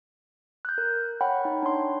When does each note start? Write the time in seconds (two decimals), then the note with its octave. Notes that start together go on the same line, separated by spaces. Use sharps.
0.65 F#6 G6
0.78 A#4
1.21 C#5 F#5 G5 B5
1.45 D#4
1.63 D4 C#5 C6